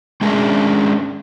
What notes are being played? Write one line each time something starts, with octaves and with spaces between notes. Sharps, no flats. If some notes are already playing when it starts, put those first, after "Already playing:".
G#3 C#4 D4 G#4 A#4 E5